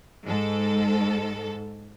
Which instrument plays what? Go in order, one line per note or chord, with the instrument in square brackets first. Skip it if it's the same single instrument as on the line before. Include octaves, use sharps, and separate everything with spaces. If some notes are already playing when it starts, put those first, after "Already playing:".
[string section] G#2 A4